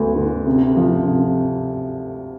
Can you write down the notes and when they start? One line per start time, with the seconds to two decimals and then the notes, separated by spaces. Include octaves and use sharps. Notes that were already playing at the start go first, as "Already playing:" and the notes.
Already playing: D2 B3
0.16 D3
0.47 C3
0.76 F3
1.06 C3